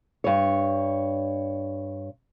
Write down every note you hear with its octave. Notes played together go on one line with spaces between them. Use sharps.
G2 C#5